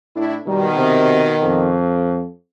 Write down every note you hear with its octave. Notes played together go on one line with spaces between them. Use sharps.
A2 D4 E4
B2 D#3 G3
C3
F2